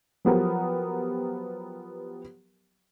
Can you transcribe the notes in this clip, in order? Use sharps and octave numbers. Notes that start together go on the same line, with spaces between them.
F3 F#3 B3 G4 A#4